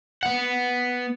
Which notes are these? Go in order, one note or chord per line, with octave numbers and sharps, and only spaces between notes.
B3 F#5